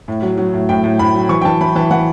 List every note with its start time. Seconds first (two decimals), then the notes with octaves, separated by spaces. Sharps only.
0.08 A2
0.22 F#3
0.38 F#3
0.53 A2
0.69 A2 G5
0.84 A2
0.99 A2 B5
1.14 F#3
1.29 E3 C#6
1.41 G5
1.44 E3 A5
1.61 E3 B5
1.76 E3 A5
1.91 E3 F#5